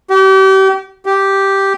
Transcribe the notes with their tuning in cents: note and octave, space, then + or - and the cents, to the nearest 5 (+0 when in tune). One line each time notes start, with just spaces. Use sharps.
G4 -35
G4 -5